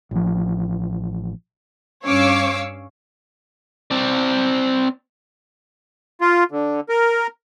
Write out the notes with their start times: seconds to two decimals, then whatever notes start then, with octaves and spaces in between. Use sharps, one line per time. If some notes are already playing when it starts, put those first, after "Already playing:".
0.11 A1 F3
2.05 G2 C#4 C#5 F5 D6 E6
3.91 C4 D5
6.21 F4
6.51 D3
6.89 A#4